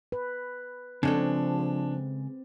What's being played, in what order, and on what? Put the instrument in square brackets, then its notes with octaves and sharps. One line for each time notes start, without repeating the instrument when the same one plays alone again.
[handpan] B4
[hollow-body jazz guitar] C#3 G#3 A4 [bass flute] F3 [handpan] C4 [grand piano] D4